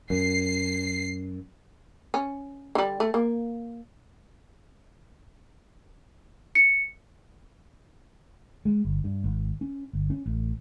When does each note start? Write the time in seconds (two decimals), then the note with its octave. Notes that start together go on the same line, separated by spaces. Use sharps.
0.10 F#2 C7
2.14 C#4
2.75 D3 G3
3.00 A3
3.14 A#3
6.55 C#7
8.65 G#3
8.85 G1
9.04 G2
9.24 G#1
9.61 C#4
9.93 G1
10.10 C#4
10.26 A1